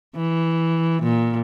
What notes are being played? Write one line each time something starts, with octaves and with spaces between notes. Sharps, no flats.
E3
A#2